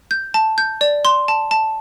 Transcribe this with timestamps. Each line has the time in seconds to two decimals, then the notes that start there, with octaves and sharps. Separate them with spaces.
0.11 G6
0.34 A5
0.58 G6
0.81 D5
1.05 C6
1.28 A5
1.51 A5